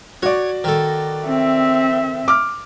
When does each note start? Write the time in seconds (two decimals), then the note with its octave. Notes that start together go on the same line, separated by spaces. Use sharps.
0.23 F#4 C#5 D5
0.64 D#3 A4
1.26 C4 E5
2.28 D6 F6